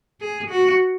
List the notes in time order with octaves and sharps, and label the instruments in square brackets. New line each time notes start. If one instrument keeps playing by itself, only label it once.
[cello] G#4
F#4